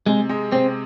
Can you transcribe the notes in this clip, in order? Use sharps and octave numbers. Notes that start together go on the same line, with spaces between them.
C3 G#3
G#3
C3 C4